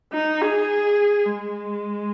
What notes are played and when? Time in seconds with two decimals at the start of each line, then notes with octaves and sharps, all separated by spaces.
0.13 D#4
0.41 G#4
1.26 G#3